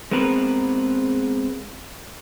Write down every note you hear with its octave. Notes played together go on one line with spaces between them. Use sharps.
G#3 B3 C4 A#4 B4